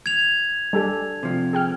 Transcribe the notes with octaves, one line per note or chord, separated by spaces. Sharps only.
G#6 F7
G3 D4 G4 A4 G#5
C3 F3
G#4 G5 F6